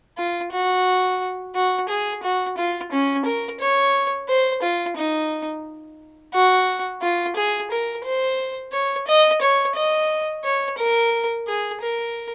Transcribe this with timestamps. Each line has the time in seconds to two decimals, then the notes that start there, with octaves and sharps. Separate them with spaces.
0.17 F4
0.52 F#4
1.55 F#4
1.88 G#4
2.23 F#4
2.57 F4
2.92 C#4
3.25 A#4
3.60 C#5
4.28 C5
4.62 F4
4.97 D#4
6.33 F#4
7.02 F4
7.36 G#4
7.71 A#4
8.05 C5
8.72 C#5
9.08 D#5
9.41 C#5
9.76 D#5
10.44 C#5
10.78 A#4
11.47 G#4
11.81 A#4